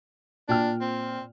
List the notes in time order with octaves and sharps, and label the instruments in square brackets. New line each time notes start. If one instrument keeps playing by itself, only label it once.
[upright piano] A#2 G5 F6 [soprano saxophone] D4
[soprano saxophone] C4